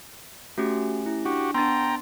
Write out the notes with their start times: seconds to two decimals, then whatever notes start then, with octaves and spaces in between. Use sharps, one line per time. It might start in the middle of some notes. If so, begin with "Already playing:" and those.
0.58 A3 C#4 F#4 G4
1.06 E4
1.25 D4 F#4 G4
1.54 B3 D4 G5 A#5 C6 A6